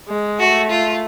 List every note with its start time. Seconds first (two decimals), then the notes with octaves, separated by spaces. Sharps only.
0.09 G#3
0.39 A3 F#4
0.70 F4